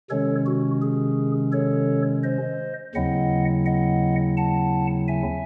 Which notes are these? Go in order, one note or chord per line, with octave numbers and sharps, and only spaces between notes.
C3 D#3 G#3 C#4 A4 C#5
F#4
G#4
A4 C#5
C5 D#5
D#2 C#3 F#3 C4 E4 D#5 F#5
D#5 F#5
F#5 A5
E5 G#5